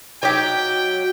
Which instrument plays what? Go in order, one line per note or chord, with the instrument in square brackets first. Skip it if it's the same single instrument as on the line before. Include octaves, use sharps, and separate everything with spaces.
[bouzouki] F#3 [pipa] D#4 G4 [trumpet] G5